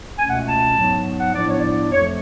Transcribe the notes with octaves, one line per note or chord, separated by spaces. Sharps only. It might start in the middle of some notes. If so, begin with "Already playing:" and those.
C#2 B2 A3 C#4 G#5
F#5
A5
G#2 F#3 B3
F#5
A2 F3 B3 D4 D5
C#5
D5
F2 F3 A3 C#5